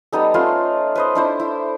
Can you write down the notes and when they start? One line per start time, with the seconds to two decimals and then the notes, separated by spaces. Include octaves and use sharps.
0.13 G3 B3 D#4 A4
0.34 A3 C#4 F4 C6
0.95 B4 C5 D#5
1.15 D4 E4 C5
1.40 E4